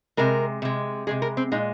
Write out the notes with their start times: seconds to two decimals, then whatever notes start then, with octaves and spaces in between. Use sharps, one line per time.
0.17 C3 G#3 A#4
0.62 C3 G#3
1.07 C3 D#3 G#3 G#4
1.22 A#4
1.37 C4
1.52 A#2 G#3 D#4